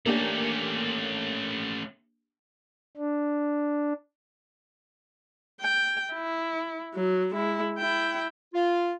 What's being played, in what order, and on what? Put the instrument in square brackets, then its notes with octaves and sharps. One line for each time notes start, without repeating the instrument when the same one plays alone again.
[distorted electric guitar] A3 C#4 [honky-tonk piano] A#3 D4 G4
[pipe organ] D4
[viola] G5
E4
F#3
G#3 E4
E4 G5
[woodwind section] F4